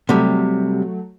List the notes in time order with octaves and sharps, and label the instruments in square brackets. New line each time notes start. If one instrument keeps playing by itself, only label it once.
[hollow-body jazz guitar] C3 G3 [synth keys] F#3 A3